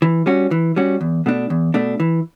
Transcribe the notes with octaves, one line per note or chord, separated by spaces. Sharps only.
E3
G3 C#4 F#4
E3
G3 C#4 F#4
E2
B2 A3 D4
E2
B2 A3 D4
E3